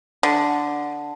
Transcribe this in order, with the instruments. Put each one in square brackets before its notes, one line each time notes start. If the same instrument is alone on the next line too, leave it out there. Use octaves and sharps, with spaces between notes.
[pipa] D3